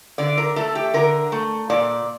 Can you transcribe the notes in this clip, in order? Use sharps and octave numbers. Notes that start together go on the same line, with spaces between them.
D3 D5
A#4
A3 A4
G4
D3 A#4
A3
A#2 D5